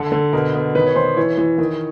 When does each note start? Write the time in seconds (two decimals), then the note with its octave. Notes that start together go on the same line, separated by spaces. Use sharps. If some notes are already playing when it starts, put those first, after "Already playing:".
Already playing: D3 A4
0.12 D3
0.33 B2 A#4
0.54 B2
0.75 D#3 B4
0.86 C#5
0.95 D#3 C5
1.17 E3 C#5
1.37 E3
1.58 D#3